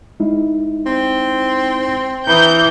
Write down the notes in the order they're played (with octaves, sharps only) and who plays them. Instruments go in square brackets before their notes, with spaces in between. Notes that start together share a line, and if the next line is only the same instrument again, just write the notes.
[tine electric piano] G#3 D#4 E4
[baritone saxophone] C4
[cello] E3 [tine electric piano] A#5 B5 D#6 [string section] G6